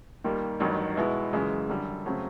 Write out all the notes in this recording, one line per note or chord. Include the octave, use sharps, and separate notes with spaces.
D#2 D#3 G3 A#3
A1 G2 D#3 F#3
B2 G#3 B3 E4
F#2 C#3 E3 G#3
F#2 D3 G3
C#3 F#3 A3 C4